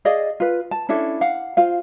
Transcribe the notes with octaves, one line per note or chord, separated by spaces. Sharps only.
G#4 D5 D#5 F5
F4 B4
A5
C#4 D4 E4 A4
F5 F#5
F4 C5 F5